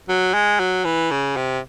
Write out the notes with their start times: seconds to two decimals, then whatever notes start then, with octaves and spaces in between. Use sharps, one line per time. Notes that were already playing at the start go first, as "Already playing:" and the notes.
0.08 F#3
0.34 G#3
0.59 F#3
0.85 E3
1.11 C#3
1.36 C3